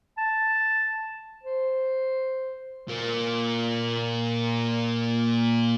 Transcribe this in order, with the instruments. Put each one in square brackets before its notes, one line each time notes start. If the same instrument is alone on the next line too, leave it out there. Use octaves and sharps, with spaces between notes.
[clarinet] A5
C5
[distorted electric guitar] A#2 A#3